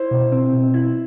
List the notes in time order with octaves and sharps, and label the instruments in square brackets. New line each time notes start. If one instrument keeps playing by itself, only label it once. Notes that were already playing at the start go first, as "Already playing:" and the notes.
Already playing: [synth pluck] E4 [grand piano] C5
[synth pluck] B2
C4
B2
E4